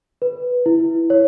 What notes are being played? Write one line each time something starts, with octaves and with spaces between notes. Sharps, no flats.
B4
E4
C#5